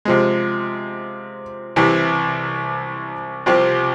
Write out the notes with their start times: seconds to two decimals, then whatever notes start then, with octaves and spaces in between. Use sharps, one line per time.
0.05 C3 F3 G#3
1.76 C2 C3 E3
3.46 C2 C3 F3 C4 G4